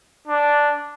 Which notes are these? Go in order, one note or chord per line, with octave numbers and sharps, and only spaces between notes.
D4